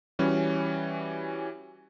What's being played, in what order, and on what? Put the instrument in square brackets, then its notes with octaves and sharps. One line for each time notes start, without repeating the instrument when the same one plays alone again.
[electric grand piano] E3 G3 C#4 F#4